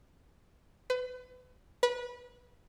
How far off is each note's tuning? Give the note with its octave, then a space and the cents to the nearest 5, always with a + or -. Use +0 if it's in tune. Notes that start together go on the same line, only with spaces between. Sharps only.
B4 +35
B4 -25